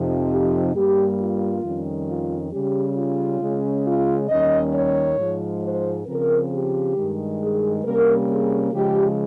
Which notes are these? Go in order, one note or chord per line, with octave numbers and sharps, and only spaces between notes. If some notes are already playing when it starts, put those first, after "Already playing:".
Already playing: F2 C3 F3 C4 D#4
G4
G2 G3 A#3 G4
F4
F2 D#3 G3 C#4
F4
C#3 G3 C#4 G4
F4
C#3 G#3 C#4
F4
D#2 D#3 G3 C#4 D#5
C#5
G#2 F3 G#3
C5
C#3 F3 C4 A#4
G4
G2 D#3 G#3
G#4
C3 G3 A#3 C#4 A#4
G#4
C#3 F3 G#3 G4